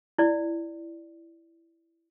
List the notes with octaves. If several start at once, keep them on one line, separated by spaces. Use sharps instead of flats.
E4 D5